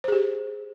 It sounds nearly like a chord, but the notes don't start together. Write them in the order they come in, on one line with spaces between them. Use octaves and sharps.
C5 G#4 G4